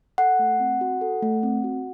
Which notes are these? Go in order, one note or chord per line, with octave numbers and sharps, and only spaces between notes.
A4 F#5
A3
C4
F#4
A4
A3
C4
F#4